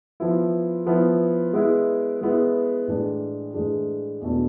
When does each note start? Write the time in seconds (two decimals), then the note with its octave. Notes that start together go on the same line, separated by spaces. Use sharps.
0.20 F3 B3 E4
0.86 F3 B3 E4
1.53 G#3 B3 E4
2.21 G#3 B3 E4
2.88 A2 E3 G#3 D4
3.54 A2 E3 G#3 D4
4.21 E2 B2 A3 D4